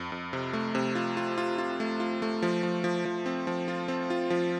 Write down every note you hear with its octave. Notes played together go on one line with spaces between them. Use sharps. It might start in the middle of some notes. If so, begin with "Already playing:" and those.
Already playing: F2
F2
C3
A3
C3
F4
F4
F4
F4
A3
F4
A3
F3
F3
F3
F3
C4
F3
F4
C4
F4
F3